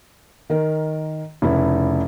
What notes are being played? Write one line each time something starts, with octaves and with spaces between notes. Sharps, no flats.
D#3 A#4
F1 C#3 E4